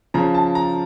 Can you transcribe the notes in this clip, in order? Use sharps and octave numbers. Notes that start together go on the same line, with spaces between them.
C#3 F3 A#5
A5
A#5